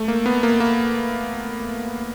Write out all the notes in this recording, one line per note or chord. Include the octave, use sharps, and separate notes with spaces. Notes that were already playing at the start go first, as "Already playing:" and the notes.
Already playing: A3
A#3
B3
A#3
A#3